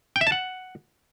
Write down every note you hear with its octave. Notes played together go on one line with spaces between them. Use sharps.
G5
E5
A5
F#5